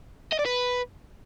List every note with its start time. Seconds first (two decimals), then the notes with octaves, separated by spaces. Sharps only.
0.33 D#5
0.39 D5
0.46 B4